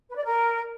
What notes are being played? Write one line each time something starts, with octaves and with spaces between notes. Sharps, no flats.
B4
D5
A#4